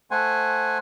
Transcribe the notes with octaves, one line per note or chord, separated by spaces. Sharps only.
A3 C5 F#5 G#5